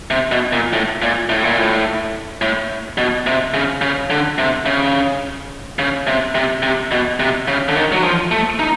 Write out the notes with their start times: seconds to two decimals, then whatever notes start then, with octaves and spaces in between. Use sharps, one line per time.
0.10 C3
0.32 B2
0.53 A#2
0.73 A2
1.02 A#2
1.29 A2
1.43 A#2
1.58 A2
2.41 A2
2.98 B2
3.27 C3
3.54 C#3
3.82 C#3
4.10 D3
4.38 C3
4.66 C#3
5.79 C#3
6.07 C3
6.35 C3
6.63 C3
6.91 B2
7.20 C3
7.48 C#3
7.69 D3
7.76 D#3
7.92 F#3
8.03 F3
8.31 A3
8.59 D#4